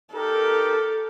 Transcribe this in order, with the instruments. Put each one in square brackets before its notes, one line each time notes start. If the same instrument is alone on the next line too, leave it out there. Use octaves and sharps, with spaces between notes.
[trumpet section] D#4 G4 A#4 [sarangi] A4